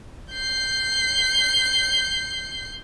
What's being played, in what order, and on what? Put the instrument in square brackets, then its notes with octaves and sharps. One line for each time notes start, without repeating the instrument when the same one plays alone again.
[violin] G6 C7